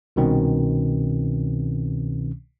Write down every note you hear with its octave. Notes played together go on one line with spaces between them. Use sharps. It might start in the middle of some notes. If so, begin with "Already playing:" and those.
C2 B2 D#3 C4 C#4